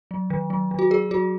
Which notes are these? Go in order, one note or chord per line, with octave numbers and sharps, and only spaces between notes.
F#3
D#3
F#3
D#3
F#4
F#3 G#4
F#3 F#4